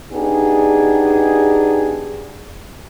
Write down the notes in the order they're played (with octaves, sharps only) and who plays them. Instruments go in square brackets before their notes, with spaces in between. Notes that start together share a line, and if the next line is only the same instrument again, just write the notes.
[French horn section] B3 D4 D#4 G4 G#4